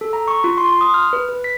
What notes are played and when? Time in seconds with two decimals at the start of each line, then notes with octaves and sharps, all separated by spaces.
0.01 A4
0.13 A#5
0.28 C#6
0.44 F4
0.58 C6
0.69 C6
0.81 D#6
0.94 F6
1.13 B4
1.29 B4
1.44 B6